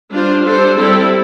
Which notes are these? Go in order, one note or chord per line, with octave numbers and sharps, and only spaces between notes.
G3 D4 F4 C5
G3 D4 A4 C5
G3 C4 E4 A4